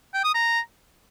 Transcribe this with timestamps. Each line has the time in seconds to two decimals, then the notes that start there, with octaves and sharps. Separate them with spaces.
0.14 G5
0.24 D#6
0.34 A#5